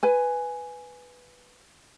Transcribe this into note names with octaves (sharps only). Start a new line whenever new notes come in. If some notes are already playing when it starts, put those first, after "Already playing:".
B4 G#5